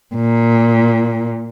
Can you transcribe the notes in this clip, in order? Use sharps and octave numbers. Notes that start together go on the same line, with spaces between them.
A#2